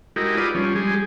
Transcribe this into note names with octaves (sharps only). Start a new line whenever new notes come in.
G#3 D#4 E4 F#4 G4 A#4
F4 B4 D5 D#6
F3 G3 C#4
G3 G#3 G#4